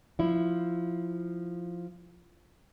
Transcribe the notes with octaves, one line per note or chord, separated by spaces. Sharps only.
F3 E4